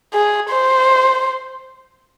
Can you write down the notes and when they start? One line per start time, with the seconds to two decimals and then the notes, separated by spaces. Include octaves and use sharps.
0.14 G#4
0.50 C5